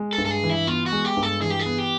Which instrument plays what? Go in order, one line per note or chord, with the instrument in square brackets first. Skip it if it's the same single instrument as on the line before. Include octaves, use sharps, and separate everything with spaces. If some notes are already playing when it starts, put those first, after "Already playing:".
Already playing: [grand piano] G#3
[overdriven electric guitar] A4
[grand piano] G2
[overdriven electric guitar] A4
G#4
[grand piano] E3
[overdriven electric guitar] E4
[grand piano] B3 [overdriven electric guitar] F4
[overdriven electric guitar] F#4
[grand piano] G#3
[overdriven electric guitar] G4
[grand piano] G2
[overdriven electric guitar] A4
[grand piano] E3 [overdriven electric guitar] G#4
[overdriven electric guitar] G4
G#4
[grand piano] B3
[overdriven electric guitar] G4